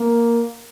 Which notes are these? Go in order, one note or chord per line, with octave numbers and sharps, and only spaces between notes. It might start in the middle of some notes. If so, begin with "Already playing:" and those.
Already playing: A#3